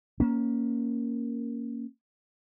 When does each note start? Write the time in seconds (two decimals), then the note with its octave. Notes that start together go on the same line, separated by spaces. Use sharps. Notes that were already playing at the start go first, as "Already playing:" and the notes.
0.20 A#3 C#4